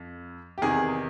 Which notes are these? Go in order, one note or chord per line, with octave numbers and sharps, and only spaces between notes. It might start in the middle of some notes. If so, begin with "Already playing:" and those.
Already playing: F2
G4
E2 C3 D#3 G#4